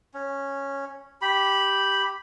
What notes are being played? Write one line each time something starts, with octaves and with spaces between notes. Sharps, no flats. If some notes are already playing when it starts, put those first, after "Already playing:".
C#4
G4 B5